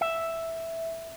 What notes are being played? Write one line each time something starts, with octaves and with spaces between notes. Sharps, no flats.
E5